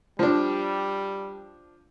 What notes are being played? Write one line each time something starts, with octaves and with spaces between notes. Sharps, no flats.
F3 G3 D4